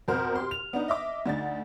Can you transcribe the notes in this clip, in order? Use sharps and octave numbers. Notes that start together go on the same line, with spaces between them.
F2 B2 F#4 A#4 C5 F6
G4 C6
F7
B3 D4 D#4
D#5 E5 D6
D2 D3 D#4 A6